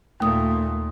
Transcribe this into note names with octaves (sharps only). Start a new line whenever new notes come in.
D#2 A#2 A3 D#6